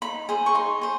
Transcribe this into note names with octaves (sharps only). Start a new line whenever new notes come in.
D#4 B5
G#4 C5
C#6
D#4 C6
G#4 C5